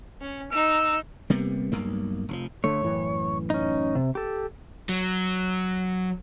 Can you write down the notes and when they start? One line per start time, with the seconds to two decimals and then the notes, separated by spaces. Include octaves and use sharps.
0.21 C#4
0.53 D#4 E6
1.30 C3 G3 A#3 B3
1.72 B1 G2 A#3
2.29 F1 A2 F3
2.64 D3 A3 C#5
2.81 F#2 A2 E3
3.50 C#4 D#4
3.95 C3
4.15 G4 A4
4.89 F#3